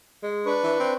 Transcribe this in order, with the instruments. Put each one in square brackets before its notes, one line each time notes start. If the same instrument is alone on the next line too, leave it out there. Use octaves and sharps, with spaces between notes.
[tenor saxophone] G#3
[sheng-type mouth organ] D4 B4 C#6
[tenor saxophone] E3
C4